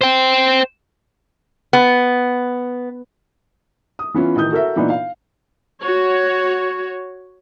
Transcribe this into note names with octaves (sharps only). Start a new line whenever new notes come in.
C5 G5
B3
D#6
E3 B3 C#4 F4
A1 D#3 D#6 G6
F#4 A4 A#4 E5
A#2 E3 B3 D4 D#4
F5
F#4 C#5